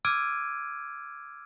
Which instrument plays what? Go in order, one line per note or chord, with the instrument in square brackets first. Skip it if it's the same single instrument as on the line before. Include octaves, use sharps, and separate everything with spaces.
[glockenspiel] D6 E6 F6 G#6 D7 D#7